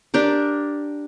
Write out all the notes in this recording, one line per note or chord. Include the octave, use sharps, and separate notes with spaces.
D4 G4 A#4